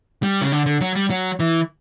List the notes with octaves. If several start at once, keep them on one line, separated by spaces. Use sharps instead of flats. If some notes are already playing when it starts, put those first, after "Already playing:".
G3
C#3
D3
D3
F#3
G3
F#3
E3